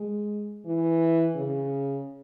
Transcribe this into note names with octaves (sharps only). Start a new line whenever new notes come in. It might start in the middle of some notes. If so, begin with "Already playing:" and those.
Already playing: G#3
E3
C#3